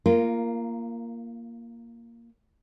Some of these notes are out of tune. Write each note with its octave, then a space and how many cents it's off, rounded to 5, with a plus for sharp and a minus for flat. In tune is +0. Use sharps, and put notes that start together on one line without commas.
A#3 +0 F4 -25 A#4 -5